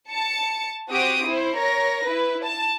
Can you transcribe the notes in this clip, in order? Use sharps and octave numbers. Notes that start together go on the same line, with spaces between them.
A5 C#7
C4 F#4 G4 D#6 D7
E4 C5
A#4 C#5 A#6
E4 B4
A5